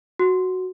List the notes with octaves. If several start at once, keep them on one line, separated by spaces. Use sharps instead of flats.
F#4